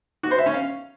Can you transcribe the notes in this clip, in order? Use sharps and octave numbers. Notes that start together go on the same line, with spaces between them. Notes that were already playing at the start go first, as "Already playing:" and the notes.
F#4
C5
E5
C#4
F5